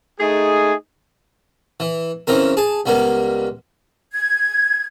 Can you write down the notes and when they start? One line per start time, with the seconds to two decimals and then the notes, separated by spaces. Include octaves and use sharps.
0.20 A3 D#4 G#4
1.80 E3
2.27 C#3 E3 C4 A#4
2.57 G#4 A5
2.86 C#2 G3 A#3 B3
4.13 G#6